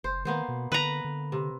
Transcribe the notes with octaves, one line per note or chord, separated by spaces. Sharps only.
F#1 C5
D#3 A#3 B3 C5
B2
D3 B4 A#5
D3
C3